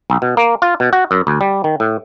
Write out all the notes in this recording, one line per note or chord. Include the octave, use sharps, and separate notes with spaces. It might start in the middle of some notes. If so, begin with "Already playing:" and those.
B1
B2
A#3
F4
B2
F#4
F#2
D2
G3
D#3
A2